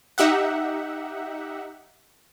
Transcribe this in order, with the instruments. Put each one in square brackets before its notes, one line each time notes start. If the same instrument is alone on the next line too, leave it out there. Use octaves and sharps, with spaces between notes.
[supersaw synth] D#4 G4 E5 F#5